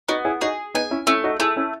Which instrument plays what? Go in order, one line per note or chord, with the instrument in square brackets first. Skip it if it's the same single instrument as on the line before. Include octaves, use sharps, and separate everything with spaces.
[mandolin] B3 [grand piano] D#4 F#4
[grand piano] E4 G#4
[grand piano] D#4 F#4 [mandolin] G#4
[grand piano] B3 D#4 [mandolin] G#5
[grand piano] C#4 E4
[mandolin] A3 [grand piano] C#4 E4
[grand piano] D#4 F#4
[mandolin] A3 [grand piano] E4 G#4
[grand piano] C#4 E4